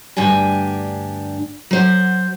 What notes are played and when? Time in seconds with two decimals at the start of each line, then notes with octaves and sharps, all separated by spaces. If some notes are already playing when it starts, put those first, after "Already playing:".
0.17 D2 G2 D4 G4 G#5
1.71 F#3 C5